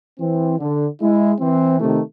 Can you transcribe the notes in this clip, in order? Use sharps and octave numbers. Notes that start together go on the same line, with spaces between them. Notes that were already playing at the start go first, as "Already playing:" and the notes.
E3 C4
D3
G#3 E4
E3 C4
C3 D#3 A3